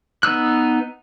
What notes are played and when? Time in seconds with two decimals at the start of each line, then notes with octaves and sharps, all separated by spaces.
0.23 B3 D#4 E6 F#6